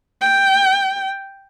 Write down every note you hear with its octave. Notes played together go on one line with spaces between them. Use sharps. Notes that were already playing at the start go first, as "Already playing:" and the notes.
G5